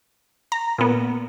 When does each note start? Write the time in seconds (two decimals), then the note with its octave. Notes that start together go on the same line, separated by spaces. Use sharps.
0.52 A#5
0.78 A#2 B3